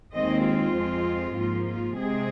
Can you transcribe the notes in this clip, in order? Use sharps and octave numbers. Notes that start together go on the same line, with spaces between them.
D#2 D#3 G#3 C4 D#5
F4
F2 F3 G#3 C4
G#2 F3 A#3 F4
F4
C3 G#3 C4 G#4